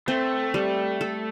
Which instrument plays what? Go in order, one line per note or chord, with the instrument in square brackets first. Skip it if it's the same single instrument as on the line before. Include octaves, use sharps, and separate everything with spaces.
[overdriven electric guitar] A3 [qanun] C4
[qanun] G3
A4